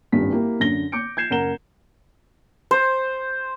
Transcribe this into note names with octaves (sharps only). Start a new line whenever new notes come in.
D#1 G#1 G2 B6
A#3 E4 G4
F#2 D3 A#6 G7
D6 G6 C#7 D7
G6 G#6 C7 E7
F#1 A#4 F#5 A#5 E7 G7
C5